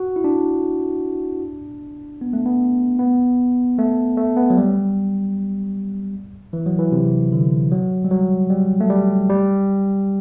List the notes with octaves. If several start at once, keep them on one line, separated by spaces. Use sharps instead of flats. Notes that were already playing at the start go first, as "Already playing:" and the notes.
Already playing: F#4
E4
D4
B3
A3
B3
B3
A3
A3
B3
F#3
G3
E3
F#3
E3
C3
D3
F#3
G3
F#3
G3
A3
G3
G3